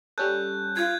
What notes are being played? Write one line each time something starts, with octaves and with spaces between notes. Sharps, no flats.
G3 C#4 A4 F#6 G6
F4 F#6 G#6